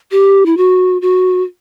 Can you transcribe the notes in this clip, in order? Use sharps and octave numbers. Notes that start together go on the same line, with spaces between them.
G4
E4
F#4
F#4